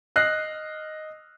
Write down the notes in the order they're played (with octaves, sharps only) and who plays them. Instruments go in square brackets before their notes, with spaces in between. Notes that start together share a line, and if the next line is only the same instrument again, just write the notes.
[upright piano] D#5 D#6 F6 F#6 A#6 C7